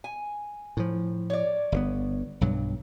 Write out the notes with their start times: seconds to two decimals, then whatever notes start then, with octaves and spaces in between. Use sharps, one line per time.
0.04 G#5
0.77 A2 F3
1.30 C#5 D5
1.72 G1 C#3 B3
2.41 B1 G2 F#3